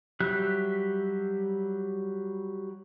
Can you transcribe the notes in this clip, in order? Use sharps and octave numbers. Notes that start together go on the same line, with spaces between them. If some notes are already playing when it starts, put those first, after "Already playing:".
F#3 G3 G4 E5 F#6